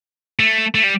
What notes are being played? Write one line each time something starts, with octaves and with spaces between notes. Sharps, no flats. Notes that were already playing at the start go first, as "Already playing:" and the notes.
A3
A3
G3